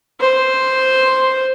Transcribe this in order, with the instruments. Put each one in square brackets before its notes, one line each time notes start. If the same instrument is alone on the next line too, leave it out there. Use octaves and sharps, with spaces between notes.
[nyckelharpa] C5